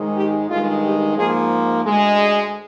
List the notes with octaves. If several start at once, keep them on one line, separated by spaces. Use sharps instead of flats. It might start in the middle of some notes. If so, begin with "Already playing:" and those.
Already playing: G#2 D#3 G#3
G4
G2 D#3 G#3 F4
G4
G#2 F3 A#3 G#4
D2 D3 G#3
G#4